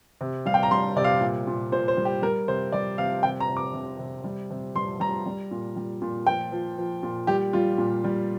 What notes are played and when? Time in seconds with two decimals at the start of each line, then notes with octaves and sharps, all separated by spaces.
0.21 C3
0.46 G3 F5
0.54 G5
0.63 A#5
0.71 G3 C6
0.96 C3 D5
1.04 F5
1.21 A#2
1.47 A#2
1.72 A#2 C5
1.88 C5
1.97 G3
2.05 G4
2.22 G3 A#4
2.48 C3 C5
2.72 G3 D5
2.98 C3 F5
3.23 C3 G5
3.40 A#5
3.49 C3
3.57 D6
3.73 C3
3.99 C3
4.24 G3
4.50 C3
4.76 G3 C6
5.00 G3 A#5
5.26 G3
5.51 A#2
5.76 G3
6.02 A#2
6.26 F3 G5
6.52 F3
6.78 F3
7.03 A#2
7.27 G3 G4
7.53 G3 F4
7.78 A#2
8.04 G3